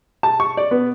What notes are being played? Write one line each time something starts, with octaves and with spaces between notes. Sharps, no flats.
A5
C#6
D5
B3